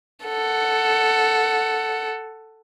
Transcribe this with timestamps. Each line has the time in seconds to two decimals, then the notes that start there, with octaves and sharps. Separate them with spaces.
0.24 A4 F#5